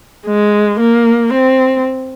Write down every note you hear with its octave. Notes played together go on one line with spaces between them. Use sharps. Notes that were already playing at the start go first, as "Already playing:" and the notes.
G#3
A#3
C4